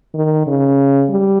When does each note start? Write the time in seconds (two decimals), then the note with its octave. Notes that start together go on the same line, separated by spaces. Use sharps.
0.14 D#3
0.47 C#3
1.09 G3